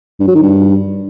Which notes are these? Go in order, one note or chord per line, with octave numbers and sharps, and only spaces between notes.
G2
F#3
D#3
G2